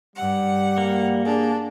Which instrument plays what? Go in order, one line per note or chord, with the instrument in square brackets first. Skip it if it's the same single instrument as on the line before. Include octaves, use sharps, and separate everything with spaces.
[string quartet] G2 F#5 [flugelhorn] G3
[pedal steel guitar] A#3
[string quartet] D4 [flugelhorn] G#4